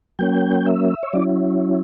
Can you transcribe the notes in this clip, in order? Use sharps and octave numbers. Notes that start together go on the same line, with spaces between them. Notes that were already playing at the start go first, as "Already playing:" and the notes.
F#3 A#3 C#4 G5
E5
C#5
F#3 C#4 E4 D5